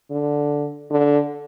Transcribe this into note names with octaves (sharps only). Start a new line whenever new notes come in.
D3
D3